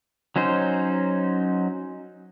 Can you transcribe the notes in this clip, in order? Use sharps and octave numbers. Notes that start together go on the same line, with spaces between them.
F#3 C#4 D#4 C5